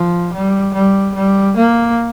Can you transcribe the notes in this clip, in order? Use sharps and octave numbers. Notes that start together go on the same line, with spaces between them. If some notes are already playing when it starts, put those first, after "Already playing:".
Already playing: F3
G3
G3
G3
A#3